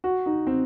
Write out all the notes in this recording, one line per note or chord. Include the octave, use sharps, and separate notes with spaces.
F#4
D#4
C4